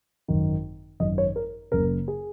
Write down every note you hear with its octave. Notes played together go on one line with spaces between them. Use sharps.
G#1 F#2 D#3
G#1 F#2 D#3 D#5
C#5
A#4
F#1 F#2 C#3 A#4
G#4